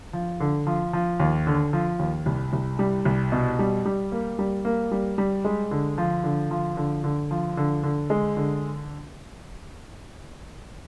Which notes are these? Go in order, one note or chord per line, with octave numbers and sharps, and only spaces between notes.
F3
D3
F3
F3
D#2
D3
F3
D#2
C2
C2
G3
C2
B2
G3
G3
A#3
G3
A#3
G3
G3
G#3
D3
F3
D3
F3
D3
D3
F3
D3
D3
G#3
D3